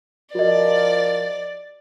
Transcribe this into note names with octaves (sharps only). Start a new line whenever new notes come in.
F3 F#4 A#4 D5 D#5